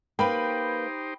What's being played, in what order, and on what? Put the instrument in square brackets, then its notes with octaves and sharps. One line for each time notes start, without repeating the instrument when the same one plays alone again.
[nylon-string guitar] A#3 B4 [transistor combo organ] D#4 G4 C5 [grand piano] G5 B5